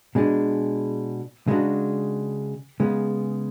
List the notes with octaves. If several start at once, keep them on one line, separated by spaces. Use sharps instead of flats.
B2 G#3 D4 G#4
C#3 G#3 D4 F#4
C#3 G#3 B3